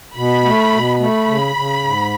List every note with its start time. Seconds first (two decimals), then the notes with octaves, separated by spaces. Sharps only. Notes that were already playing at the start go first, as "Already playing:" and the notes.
0.16 B2 B5
0.45 A3
0.73 B2
1.00 A3 B5
1.28 C#3
1.56 C#3
1.84 G#2